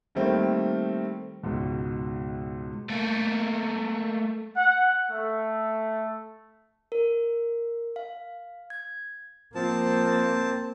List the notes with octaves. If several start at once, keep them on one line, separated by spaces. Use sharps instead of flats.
D#3 G3 A3 A#3 C4
C#2 G#2 B2
A3 A#3
F#5
A3
A#4
F5
G#6
F3 A#3 C4 A5